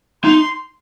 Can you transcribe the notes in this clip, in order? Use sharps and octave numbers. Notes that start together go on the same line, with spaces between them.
D#4 C6